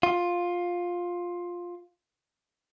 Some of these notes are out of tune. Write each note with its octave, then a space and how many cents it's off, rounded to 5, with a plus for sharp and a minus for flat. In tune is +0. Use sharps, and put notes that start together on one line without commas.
F4 +10